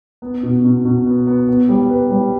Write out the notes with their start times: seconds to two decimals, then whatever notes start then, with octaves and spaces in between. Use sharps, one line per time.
0.22 B3
0.43 B2
0.64 B2
0.85 B2
1.06 B3
1.27 B3
1.48 B3
1.69 G3
1.90 B4
2.11 G3